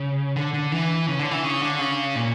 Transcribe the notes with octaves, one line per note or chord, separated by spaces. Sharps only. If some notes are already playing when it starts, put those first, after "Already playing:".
Already playing: C#3
D3
D3
E3
C#3
D3
E3
C#3
D3
C#3
A#2